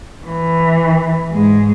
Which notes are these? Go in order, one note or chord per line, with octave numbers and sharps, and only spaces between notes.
E3
G#2 G#3